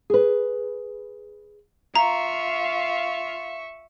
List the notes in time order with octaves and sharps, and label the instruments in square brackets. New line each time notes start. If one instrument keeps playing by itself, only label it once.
[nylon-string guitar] G#4 B4
[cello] F4 F5 [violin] E5 C#6 [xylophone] A#5